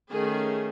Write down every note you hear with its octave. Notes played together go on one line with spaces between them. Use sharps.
D#3 A3 C#4 G#4